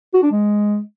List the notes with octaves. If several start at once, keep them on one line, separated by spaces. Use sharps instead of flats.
F#4
D4
G#3